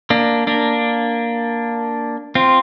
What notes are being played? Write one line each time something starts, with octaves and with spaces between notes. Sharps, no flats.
A#3 D4
A#3 D4
C4 F4